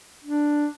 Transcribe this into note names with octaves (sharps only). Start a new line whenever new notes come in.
D4